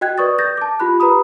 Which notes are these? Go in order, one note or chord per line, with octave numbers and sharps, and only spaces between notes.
F#4 D#5 G5 F#6 G#6
B4 D5 C#6 D#6 A6
G6 A6 A#6
A5 D6
F4 G4 B5 F#6
G4 B4 A#5 B5 D#6